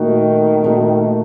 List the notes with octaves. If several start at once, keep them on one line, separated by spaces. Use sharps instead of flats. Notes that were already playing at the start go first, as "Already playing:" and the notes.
Already playing: A#2 D#3 A3 D#4 F#4
A#2 A3 D#4 F#4